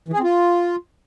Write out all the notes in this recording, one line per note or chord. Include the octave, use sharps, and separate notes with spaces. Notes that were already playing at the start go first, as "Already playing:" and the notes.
E3
G#4
C4
F4